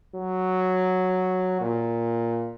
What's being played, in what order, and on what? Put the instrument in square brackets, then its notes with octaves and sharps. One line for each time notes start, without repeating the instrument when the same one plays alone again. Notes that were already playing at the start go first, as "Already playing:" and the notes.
[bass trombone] F#3
A#2